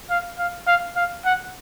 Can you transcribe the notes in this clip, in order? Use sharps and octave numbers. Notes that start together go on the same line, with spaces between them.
F5
F5
F5
F5
F#5